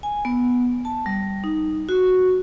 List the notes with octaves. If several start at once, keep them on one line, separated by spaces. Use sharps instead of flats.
G#5
B3
A5
G3
D#4
F#4